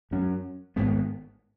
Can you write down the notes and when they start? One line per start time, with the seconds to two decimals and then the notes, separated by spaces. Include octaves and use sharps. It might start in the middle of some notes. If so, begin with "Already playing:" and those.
0.11 F#2 F#3 C#4
0.76 G#1 G#2 G#3 B3